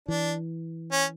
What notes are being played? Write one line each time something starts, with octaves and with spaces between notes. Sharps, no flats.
E3 D4
C#4